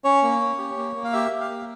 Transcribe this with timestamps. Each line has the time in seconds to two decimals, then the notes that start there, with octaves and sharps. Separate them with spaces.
0.04 C#4 C#5
0.23 A#3
0.41 C#4
0.58 G4
0.77 A#3
0.96 A#3
1.04 F5
1.13 G4 E5
1.32 G4
1.40 F5
1.50 A#3